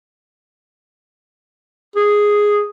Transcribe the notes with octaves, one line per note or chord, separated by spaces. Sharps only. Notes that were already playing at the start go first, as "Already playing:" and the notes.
G#4